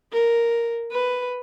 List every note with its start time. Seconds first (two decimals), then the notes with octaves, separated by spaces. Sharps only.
0.12 A#4
0.92 B4